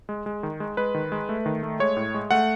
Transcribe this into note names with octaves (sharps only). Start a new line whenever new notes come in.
G#3
G#3
D#3
G#3
G#3 B4
D#3
G#3
A3
D#3
A3
G#3 C#5
A2
G#3
A3 F#5